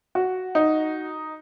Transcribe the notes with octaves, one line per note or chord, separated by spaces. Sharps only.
F#4
D#4